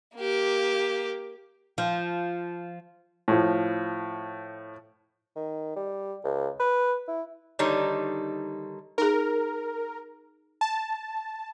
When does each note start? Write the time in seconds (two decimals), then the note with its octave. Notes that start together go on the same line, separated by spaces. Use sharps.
0.16 A#3 G4
1.78 F3
3.28 A2 F3
5.36 D#3
5.76 G3
6.24 C#2
6.59 B4
7.08 E4
7.59 D3 D#3 G3 D#4 C#5
8.98 D#4 G#4 A#4
10.61 A5